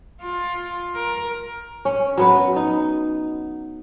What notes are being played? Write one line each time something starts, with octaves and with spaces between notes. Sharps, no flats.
F4
A#4
C#4
F#3 B3 B4
D#4